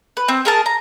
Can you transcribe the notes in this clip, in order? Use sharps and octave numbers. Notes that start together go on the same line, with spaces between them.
B4
C4
G#4 A#4 A5
A#5